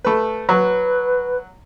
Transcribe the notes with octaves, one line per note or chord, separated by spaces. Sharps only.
A3 B4
F#3 B4